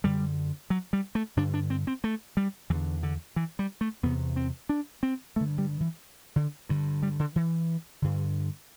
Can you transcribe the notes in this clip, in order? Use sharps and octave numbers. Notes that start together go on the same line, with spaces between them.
F#2 D3 G3
F#3
G3
A3
G2 D3 D4
D4
C4
C4
A3
G3
E2 D3 E3
D3
E3
G3
A3
E2 C3 B3
C4
D4
C4
G2 D3 A3
G3
E3
D3
G2 D3
G3
D3
E3
G2 D3